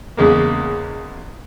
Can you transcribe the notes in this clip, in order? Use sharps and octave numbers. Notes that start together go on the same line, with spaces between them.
E2 C#3 G#3 A#3